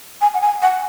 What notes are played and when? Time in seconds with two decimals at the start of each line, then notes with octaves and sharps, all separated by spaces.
0.21 G#5
0.34 F#5
0.41 G#5
0.62 F#5